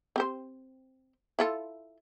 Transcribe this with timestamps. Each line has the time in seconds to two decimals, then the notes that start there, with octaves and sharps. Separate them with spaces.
0.16 C4 G4 C5
1.39 E4 F4 A4